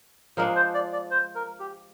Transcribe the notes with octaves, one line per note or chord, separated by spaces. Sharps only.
F3 G#3 D4 A#4
C5
D5
D5
C5
A#4
G4